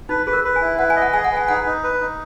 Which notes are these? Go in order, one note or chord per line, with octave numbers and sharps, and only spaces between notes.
D#4 B4
G#4 B4
A#4
B4
G#5
E4
B4 F#5
G#5
D#5
F#5
G#4 G#5
F#5
B4
G#5
D#4 F#5
D#4
B4
D#4